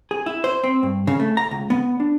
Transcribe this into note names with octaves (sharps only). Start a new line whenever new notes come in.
G#4
E4
C5
C4
G2
C#3
A3
A#5
C#2
B3
D4